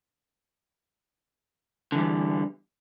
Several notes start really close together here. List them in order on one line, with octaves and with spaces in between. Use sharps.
D3 E3 G3 E2